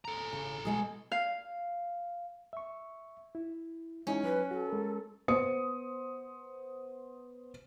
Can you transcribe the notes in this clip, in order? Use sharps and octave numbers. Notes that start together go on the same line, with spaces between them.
A4 A#5
C#3
B2 G#3 G#4
F5
E5 C#6
E4
G#3 C#4 D#4 E4
F#3 B4
F#4 A4
G#3 A#4
B3 C5 D#6 C#7